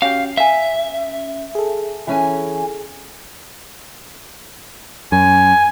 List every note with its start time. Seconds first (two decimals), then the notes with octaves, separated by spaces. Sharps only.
0.02 C#4 F#4 G4 F5
0.37 E5 F5 G#5
1.55 G#4 A4
2.07 E3 C#4 G#5
5.12 F#2 G#5